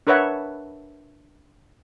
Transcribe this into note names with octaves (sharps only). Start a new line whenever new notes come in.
D4 A#4 B4 C#5 E5 F#5